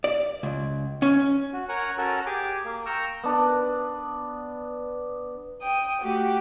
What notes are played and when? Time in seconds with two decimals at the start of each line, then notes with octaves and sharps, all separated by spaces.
0.04 D5
0.43 C#2
1.02 C#4
1.53 F#4
1.69 A#4 C#5 F#5 G#5
1.98 C#4 F#4 A4 A#4
2.26 G4 G#4 G#5 D6
2.64 A#3
2.86 G5 A#5 C#6 E6
3.24 B3 D4
5.63 G5 D#6
6.02 A3 F#4 G4